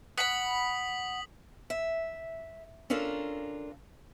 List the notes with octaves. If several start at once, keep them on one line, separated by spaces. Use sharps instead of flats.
F#5 B5 D#6 B6 F#7
E5
C#4 D4 F4 A4 A#4